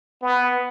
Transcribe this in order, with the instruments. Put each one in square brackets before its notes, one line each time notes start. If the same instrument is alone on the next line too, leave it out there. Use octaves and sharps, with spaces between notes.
[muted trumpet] B3